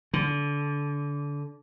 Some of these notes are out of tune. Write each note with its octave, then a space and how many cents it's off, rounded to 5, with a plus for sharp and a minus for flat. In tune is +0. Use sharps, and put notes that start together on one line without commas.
D3 -25